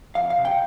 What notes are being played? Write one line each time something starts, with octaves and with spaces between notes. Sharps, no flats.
F2 F5
F5
C3
G5